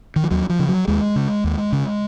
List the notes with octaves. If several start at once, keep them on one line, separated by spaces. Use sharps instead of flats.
D#3
F3
D#2 F#3
F3
C#3
F#3
D#2 G#3
C#3
D#2
C#3